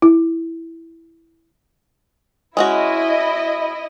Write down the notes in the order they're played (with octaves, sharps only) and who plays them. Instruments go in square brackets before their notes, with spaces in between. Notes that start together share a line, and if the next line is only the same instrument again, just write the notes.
[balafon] E4
[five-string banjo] G#3 C#4 F#4 [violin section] E4 D#5